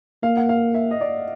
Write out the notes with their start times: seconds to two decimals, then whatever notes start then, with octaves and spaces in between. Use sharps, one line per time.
0.23 A#3 F5
0.37 F#5
0.49 F5
0.74 E5
0.91 D#5
1.01 D5